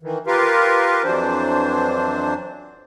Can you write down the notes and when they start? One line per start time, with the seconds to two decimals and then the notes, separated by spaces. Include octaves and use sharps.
0.03 D#3 E3
0.27 F4 G4 A#4 B4 F5
1.04 F2 E3 F#3 D4 C5